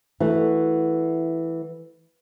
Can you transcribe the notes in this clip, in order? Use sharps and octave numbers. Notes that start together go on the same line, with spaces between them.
E3 A3 F#4